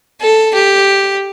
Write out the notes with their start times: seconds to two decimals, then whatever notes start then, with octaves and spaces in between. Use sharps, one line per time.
0.21 A4
0.54 G4